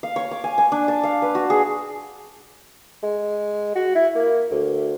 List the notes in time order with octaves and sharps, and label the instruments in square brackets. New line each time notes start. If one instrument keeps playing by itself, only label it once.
[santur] F5
C#5
D6
G#5
G#5
D4
A5
F5
B4
F#4
G#4
[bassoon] G#3
F#4
E4
A#3
D2